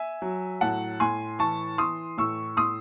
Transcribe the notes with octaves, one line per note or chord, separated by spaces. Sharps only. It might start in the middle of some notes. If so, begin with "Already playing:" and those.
Already playing: E5 G#5
F#3
A2 F#5 A5
A2 G#5 C6
E3 A5 C#6
E3 C6 D#6
A2 C#6 E6
A2 C6 D#6